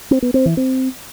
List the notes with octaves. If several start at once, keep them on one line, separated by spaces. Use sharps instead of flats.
C4
B3
C4
E3
C4